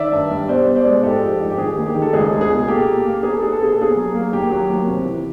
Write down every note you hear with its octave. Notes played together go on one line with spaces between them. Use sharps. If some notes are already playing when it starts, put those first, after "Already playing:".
Already playing: D#3 D5 E5
G2
G3
B2 C5 D5
B2
C5 D5
G#3
G#2 G4 A4
F3
G#2
G4
D#3 G#4
D#2
G4
D#3
A4
C#2 G#4
C#2
G#4
B2
A#3 G4 A4
A#2
A#3
B3 G#4
A4
B3 G#4
A4
B2 G#4
A4
A#3 G#4
F#3
A#3
D#2 G4
F#3
D#2
C3
E3